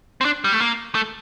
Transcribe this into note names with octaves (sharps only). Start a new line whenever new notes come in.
C4
D4
G3
A3
A#3
A3